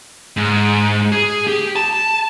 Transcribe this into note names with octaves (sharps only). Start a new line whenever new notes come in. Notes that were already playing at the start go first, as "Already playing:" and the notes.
G#2
G#4
G4
A5